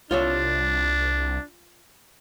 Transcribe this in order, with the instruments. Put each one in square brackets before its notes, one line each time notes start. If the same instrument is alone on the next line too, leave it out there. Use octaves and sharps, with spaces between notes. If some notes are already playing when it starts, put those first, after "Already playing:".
[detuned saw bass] C2 [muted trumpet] D4 [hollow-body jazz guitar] F4 C#5 E5